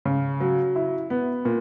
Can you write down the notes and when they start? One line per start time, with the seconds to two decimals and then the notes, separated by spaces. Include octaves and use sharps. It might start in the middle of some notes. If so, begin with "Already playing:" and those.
0.05 C#3
0.41 F#3
0.76 E4
1.10 B3
1.45 A#2